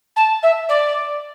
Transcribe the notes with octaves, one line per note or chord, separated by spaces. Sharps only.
A5
E5
D5